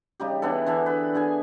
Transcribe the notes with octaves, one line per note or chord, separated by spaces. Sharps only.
C#3 G3 D#4 G4
E3 B3 D4 A4
D3 E3 E5 A5
B4
D3 G#4 G#5